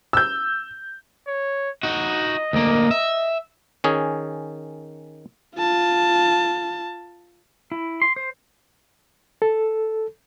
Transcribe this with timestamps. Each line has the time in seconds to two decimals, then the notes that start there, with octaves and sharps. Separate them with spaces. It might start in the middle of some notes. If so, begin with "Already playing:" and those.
0.13 E6 G6
1.27 C#5
1.83 D#4 F#4 D#5
2.53 D2 A#3
2.91 E5
3.84 D#3 C#4 G#4
5.56 F4 A5
7.72 E4
8.02 C6
8.16 C5
9.42 A4